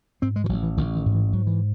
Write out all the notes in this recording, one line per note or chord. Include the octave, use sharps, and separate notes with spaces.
G#2 C4
G#3
E3
A1 F#3
E3
A1 D#3
D#3
G#2
E3
G#2 F#3
E3